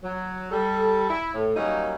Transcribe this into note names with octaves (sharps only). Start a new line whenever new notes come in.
F#3
G3 A4
E4
A2
D#3 F#3 G3 A#3 C#4 D#4